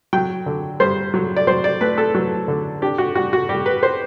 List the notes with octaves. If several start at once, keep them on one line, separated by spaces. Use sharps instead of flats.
F#3 G5
D3
G2 C5
F#3
D5
F#3 C5
D5
A3 B4
A4
F#3
D3
D4 G4
F#4
G3 F#4
F#4
G3 G4
B4
C5